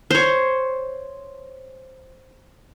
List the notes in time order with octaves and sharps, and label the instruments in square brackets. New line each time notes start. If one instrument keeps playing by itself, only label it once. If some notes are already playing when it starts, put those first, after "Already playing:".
[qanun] C5 C#5